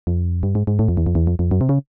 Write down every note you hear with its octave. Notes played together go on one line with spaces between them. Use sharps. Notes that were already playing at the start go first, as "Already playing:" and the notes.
F2
G2
G#2
G#2
A2
F2
E2
F2
E2
F2
F2
F#2
C3
C#3